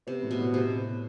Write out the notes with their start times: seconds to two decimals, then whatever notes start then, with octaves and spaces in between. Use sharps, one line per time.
0.07 C3 B3
0.22 A2
0.31 B2
0.39 A2
0.54 C3